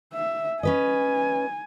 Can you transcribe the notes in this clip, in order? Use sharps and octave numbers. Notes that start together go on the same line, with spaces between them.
E5
C#4 B4 D#5 G#5